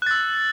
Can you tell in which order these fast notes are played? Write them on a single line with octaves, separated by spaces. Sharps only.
F#6 A6 E6